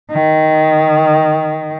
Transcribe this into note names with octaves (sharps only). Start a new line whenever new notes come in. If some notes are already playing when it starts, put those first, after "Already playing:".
D#3